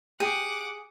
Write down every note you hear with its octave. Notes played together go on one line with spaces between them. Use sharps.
G4 G#4 F#5 D6